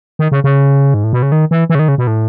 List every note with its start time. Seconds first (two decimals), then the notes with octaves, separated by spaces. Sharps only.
0.19 D#3
0.32 C#3
0.44 C#3
0.94 G#2
1.04 A2
1.13 B2
1.23 C#3
1.32 D#3
1.51 E3
1.70 E3
1.75 C#3
1.79 D#3
1.88 C#3
1.98 B2
2.07 A2